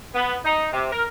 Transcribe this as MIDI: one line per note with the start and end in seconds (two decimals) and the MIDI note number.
0.15 0.36 59
0.44 0.68 63
0.72 0.89 48
0.91 1.05 70